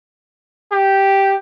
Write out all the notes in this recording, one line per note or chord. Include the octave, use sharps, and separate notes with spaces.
G4